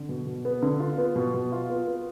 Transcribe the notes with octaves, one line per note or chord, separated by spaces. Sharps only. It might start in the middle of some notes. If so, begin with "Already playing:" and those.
Already playing: D3
B2
B2
B3
D3
F4
B3
B2
B2
F4
B3
B3